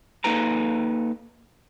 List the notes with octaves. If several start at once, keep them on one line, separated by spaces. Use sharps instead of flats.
A#3 D#4 A4 B4 A#5